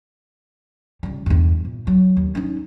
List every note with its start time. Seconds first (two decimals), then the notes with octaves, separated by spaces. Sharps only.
1.03 C#2 G3
1.26 E2 G2
1.65 A#2
1.87 F#3
2.17 D#2
2.35 C#4 D#4